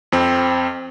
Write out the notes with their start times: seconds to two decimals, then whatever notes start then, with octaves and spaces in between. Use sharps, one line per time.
0.12 F2 C4